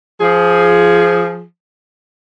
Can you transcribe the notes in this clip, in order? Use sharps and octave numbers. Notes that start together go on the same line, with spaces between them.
F3 G#4